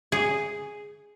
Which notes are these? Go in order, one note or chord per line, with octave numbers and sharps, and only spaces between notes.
G#4